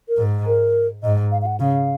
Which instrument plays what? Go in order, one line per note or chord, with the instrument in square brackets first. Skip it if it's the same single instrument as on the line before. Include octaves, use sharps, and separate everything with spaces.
[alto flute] A#4
[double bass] G#2
[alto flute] A#4
[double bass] G#2 [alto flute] D#5
[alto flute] F5
F5
F#5
[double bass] C#3 [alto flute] F5